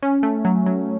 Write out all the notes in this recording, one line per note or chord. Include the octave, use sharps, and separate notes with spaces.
C#4
A3
F#3
F#3